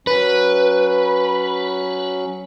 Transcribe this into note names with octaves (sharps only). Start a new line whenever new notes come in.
F#3 C#4 B4